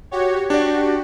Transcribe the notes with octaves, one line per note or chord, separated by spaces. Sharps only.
F#4 G4 C#5
D4 F#4 G4 D5